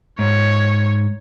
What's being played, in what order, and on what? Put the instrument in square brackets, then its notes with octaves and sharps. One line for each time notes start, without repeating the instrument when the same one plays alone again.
[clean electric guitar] G#2 [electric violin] C#5